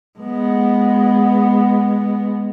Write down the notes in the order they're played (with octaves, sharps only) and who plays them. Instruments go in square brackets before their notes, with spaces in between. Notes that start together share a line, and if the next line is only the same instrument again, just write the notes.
[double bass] G#3 B3